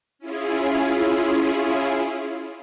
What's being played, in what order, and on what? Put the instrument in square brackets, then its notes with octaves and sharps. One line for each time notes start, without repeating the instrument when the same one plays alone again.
[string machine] C#4 E4 F4 G#4